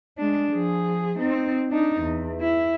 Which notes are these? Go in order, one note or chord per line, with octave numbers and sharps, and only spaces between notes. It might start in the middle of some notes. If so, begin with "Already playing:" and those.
G#3 D4
F3 G#4
C4 D#4
D4 D#4
E2
E4